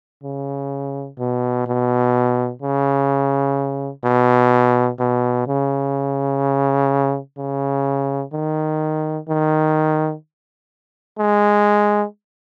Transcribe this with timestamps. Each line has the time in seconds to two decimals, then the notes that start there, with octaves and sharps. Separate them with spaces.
0.23 C#3
1.19 B2
1.66 B2
2.62 C#3
4.04 B2
4.99 B2
5.47 C#3
7.38 C#3
8.33 D#3
9.28 D#3
11.19 G#3